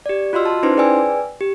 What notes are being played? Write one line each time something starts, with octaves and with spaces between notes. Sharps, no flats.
G4 D5
F4 F#4 D#5 C6 E6 F6
A5 C6
C#4 D#4 E4 B4 C5 C6
G#4 B4 D5 G5 G#5 E6
G4